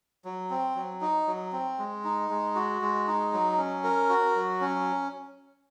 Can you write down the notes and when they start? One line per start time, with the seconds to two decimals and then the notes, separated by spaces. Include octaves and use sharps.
0.25 F#3
0.50 C4
0.75 F#3
1.01 D#4
1.27 F#3
1.52 C4
1.78 G#3
2.04 D#4
2.30 G#3
2.55 F#4
2.82 G#3
3.07 D#4
3.33 F#3
3.58 C#4
3.84 A#4
4.09 F#4
4.35 F#3
4.61 C#4